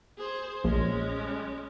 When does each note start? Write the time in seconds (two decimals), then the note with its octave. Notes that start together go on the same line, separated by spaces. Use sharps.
0.18 G#4 C5
0.64 A#1 G#3 C#4